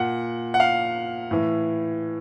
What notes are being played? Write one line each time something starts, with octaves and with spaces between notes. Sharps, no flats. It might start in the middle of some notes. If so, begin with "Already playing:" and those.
Already playing: A#2 F#5
F#5
F5
A2 E3